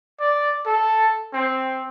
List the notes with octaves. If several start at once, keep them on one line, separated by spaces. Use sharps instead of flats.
D5
A4
C4